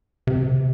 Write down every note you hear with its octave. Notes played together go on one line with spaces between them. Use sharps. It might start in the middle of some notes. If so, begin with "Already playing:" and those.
C3